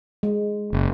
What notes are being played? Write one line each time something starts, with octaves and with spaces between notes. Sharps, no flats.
G#3
F#1